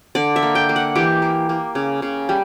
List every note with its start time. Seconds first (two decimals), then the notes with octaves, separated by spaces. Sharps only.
0.15 D3 D5
0.36 E5
0.42 A#3
0.55 G5
0.69 A#3
0.76 F#5
0.95 E3 G4
1.22 A#3
1.49 A#3
1.75 C#3
2.02 C#3
2.29 G3